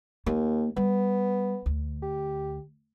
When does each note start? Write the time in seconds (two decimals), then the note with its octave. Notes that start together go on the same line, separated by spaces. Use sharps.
0.26 D#2 A#3
0.76 G3 B3
1.66 D2
2.02 G4